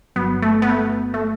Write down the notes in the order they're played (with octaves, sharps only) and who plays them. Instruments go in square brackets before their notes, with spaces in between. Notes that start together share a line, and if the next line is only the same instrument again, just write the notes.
[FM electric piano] G1 G2 F#3 [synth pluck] B3
[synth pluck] A3
B3
A3
A3